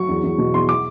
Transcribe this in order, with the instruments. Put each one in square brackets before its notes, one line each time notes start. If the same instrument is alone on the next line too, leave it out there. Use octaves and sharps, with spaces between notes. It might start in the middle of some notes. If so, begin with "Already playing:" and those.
Already playing: [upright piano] F#3 C#6
E2
E2
B2
E2 C6
D6